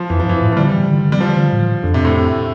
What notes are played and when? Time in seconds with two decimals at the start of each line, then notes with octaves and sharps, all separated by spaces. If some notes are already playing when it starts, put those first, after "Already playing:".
Already playing: F3
0.10 F2 E3
0.20 F3
0.26 G2 E3
0.42 A2
0.52 F3
0.57 D3 G3
0.73 E3
0.88 D3
1.04 D3
1.12 G3
1.20 E3 F3
1.36 D3
1.52 A2
1.83 F2 D3
1.94 C3
2.05 A2